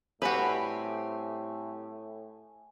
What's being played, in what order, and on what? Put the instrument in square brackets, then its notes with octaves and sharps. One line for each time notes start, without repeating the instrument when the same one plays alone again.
[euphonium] A2 [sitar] G3 C4 G4 [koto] F#4 B4 [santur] G#5